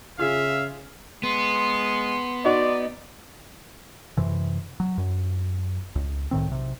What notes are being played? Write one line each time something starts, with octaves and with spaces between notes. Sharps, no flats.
C#3 F4 G#4 E5 F5
G#3 B3 C6
D#4 F#4 D5
F#2 C3 E3
F#3
F#2
C#2
C2 A2 D#3 C4
B1 C3